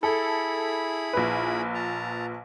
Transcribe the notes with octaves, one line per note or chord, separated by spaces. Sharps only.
E4 G#4 A4 B5
A#1 B4
A5 A#5